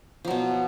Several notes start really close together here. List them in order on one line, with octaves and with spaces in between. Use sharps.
F3 F#3 B2